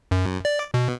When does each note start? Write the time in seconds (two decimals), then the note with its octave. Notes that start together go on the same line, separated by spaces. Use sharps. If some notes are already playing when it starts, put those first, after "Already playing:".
0.11 F#2
0.45 D5
0.74 B2